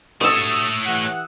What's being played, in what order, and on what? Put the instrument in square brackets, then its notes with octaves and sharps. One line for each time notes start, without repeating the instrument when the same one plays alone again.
[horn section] G2 F#4 A4 [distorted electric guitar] A3 C#5 [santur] D#6 E6
[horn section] E3 G4 F#5